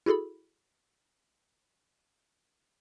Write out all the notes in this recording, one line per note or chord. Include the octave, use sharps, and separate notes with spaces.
E4 F#4 G#4 A4 B5